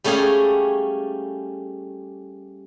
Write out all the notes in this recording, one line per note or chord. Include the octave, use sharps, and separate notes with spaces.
G3 A3 C#4 G4 G#4 F5